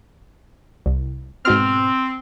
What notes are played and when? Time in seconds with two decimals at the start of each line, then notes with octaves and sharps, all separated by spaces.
0.86 C2
1.45 G#2 B2 C4 F6